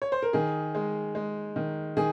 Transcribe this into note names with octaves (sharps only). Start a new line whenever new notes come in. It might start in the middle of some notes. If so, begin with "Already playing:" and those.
C#5
C5
A#4
D#3 G#4
G#3
G#3
D#3
D#3 G#4